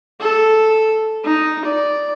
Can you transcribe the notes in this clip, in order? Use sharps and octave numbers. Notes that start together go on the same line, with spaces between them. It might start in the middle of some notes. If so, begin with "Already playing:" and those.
A4
D#4
D5